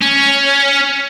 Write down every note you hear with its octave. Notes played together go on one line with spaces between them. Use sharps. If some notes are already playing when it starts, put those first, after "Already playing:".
C#4